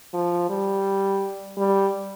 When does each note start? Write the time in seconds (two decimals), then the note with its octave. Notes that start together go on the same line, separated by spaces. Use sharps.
0.13 F3
0.49 G3
1.57 G3